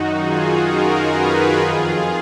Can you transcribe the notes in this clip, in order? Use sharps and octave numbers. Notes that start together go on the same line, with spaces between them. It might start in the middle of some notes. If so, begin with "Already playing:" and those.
Already playing: F#2 D#3 D#4 F#4
F4 G#4
F#4 A#4
G#4 B4
F2 D#3 F4 G#4